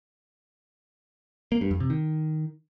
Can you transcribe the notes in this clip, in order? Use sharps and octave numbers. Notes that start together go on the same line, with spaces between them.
A#3
G2
F2
C3
D#3